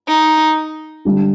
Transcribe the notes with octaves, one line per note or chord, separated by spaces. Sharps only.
D#4
D3 G3 D4